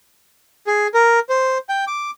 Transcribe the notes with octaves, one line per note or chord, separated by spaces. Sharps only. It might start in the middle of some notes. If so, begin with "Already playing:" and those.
G#4
A#4
C5
G5
D6